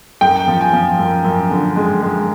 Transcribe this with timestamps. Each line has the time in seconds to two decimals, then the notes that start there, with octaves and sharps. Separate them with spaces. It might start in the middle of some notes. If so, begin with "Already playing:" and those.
0.21 F#2 G5
0.47 F3
0.61 G#5
0.73 F3
0.99 F#2
1.25 F#2
1.51 D3
1.76 G#3
2.02 G#3